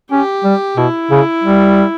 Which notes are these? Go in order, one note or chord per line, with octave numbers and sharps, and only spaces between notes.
C#4 G4
G3
B2 E4
C#3
G3